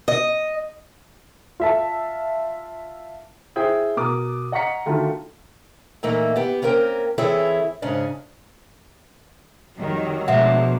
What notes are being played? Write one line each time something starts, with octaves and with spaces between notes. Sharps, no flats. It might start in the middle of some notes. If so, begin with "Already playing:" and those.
D#5
F4 E5 A5
E4 G#4 C5 G5
B2 A#4 D6 D#6
D#5 F#5 A#5 C#6 B6 C#7
D3 D#3 F#3 A3 F4 A4
A#2 E3 A3 A#3 D#4
B3 G4
A#3 C4 C#4 A#4 G5
E3 C4 E4 G#4 A4 C#5
G#2 C#3 C#4 D4
F2 D#3 F#3 G3
B2 F3 G#3 A3 D4 E5 F#5